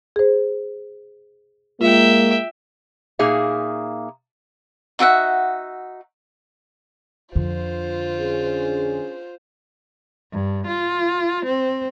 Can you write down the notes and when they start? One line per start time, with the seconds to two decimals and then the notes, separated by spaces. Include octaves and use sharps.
0.16 G#4 C5
1.81 G#3 A#3 F4 E5 G5
3.19 A#2 A#3 D#4 G#4 E5 F5
4.99 D#4 F#4 E5 F#5
7.36 F2 D3 F4 C5
8.20 C#4 D4 G#4
10.32 G2
10.68 F4
11.46 C4